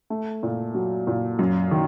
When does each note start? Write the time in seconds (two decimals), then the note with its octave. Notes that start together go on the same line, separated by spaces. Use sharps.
0.10 A3
0.43 A#2
0.75 F#3
1.07 A#2
1.39 F#2
1.71 D#3